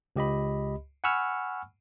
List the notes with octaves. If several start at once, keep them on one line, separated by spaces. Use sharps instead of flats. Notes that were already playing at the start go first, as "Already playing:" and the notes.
C#2 G4 D#5 B5
F#5 G#5 B5 C#6 E6 F6